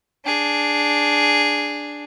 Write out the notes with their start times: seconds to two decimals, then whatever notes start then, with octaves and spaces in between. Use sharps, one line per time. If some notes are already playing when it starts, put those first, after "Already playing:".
0.25 D4 G#4